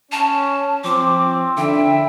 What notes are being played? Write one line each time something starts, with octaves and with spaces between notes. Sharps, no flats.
C#4 A5
F3 C4 D6
D3 E4 E5 G5